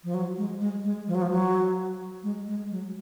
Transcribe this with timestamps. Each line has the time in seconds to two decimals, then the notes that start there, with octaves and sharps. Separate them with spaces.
0.04 F3
0.14 F#3
0.37 G#3
0.61 G#3
0.84 G#3
1.07 F3
1.15 F#3
1.22 F3
1.30 F#3
2.23 G#3
2.47 G#3
2.70 F#3